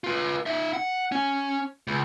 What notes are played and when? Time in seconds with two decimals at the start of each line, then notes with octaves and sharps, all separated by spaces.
0.04 F4 B4
0.46 D#4 E5
0.73 F#5
1.12 C#4
1.87 C#2